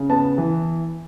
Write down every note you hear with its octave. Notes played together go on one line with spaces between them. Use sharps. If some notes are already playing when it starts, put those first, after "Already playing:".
Already playing: C#3
B3 A5
E3